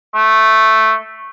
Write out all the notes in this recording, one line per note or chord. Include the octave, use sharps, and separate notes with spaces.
A3